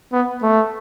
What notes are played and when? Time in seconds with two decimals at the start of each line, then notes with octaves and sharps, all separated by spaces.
0.13 B3
0.43 A3